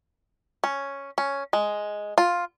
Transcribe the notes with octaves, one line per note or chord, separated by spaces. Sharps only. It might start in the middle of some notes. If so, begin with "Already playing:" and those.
C#4
C#4
G#3
F4